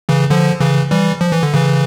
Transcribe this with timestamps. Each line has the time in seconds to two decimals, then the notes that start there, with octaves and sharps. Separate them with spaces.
0.09 C#3 E3
0.30 D3 F3
0.60 C#3 E3
0.91 E3 G3
1.21 F3
1.32 E3
1.43 D3
1.54 C#3 E3